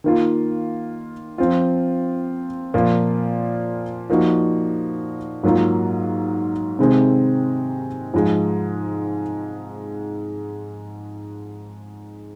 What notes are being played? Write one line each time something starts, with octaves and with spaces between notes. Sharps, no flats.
D#3 A#3 F4
F3 C4 F4
A#2 F3 A#3 F4
F3 A#3 D#4 F#4
G#2 F#3 A#3 F4
C3 D#3 G#3 C4
G#2 F3 G#3